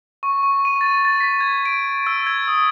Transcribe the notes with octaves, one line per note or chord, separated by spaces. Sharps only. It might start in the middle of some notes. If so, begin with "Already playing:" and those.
C#6
C#6
D#7
A6
A6
B6
G#6
D7
E6
G#6
D#6